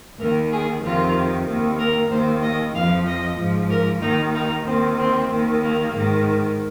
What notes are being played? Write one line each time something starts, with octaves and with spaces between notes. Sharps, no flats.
D#2 D#3 A#4
G#4
F2 C3 D#3 F4
D#2 D#3
A#4
D#2 D#3 C5
D#5
F2 F3 F5
D#5
G#2 F3
A#4
D#2 D#3 D#4
D#4
D#2 D#3 C4
C4
D#2 D#3
A#3
G#2 D#3